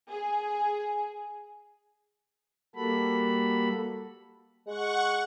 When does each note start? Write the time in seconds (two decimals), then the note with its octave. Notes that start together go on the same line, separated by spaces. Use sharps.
0.12 G#4
2.76 G3 A#3 F#4 A4 B5
4.66 G#3 F#5 C#6